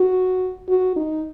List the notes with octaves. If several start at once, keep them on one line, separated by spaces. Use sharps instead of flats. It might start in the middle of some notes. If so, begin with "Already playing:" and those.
Already playing: F#4
F#4
D#4